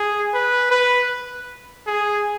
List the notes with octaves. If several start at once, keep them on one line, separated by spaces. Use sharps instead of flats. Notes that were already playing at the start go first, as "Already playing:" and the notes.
Already playing: G#4
B4
B4
G#4